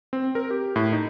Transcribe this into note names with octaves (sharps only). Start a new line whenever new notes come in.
C4
A#4
G4
A2
D#4